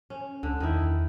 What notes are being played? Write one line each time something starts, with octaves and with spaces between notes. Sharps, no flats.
C#4
C#2 D3
E2 D#3 E4